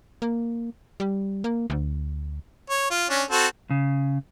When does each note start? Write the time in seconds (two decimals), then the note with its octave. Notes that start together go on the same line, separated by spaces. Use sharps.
0.22 A#3
1.00 G3
1.44 A#3
1.70 D2
2.70 C#5
2.90 F4
3.09 C#4 D4
3.31 C4 F#4 A4
3.71 C#3